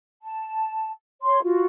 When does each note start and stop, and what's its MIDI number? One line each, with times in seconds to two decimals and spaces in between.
0.23 0.92 81
1.22 1.42 73
1.22 1.42 84
1.43 1.66 65
1.43 1.66 66